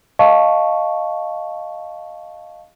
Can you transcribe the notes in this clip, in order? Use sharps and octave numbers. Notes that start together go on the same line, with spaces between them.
D#5 F5 A5 C#6